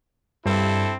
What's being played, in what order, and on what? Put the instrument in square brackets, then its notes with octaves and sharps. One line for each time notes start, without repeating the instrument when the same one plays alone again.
[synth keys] G2 [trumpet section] C4 E4 A4